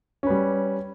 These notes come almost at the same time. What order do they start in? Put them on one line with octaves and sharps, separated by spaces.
C#4 B4 G3